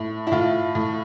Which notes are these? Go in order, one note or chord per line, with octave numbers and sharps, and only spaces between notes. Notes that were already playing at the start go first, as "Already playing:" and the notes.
Already playing: A2
E4
A2 F4
A2